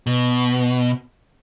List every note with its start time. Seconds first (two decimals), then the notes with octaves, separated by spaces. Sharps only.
0.07 B2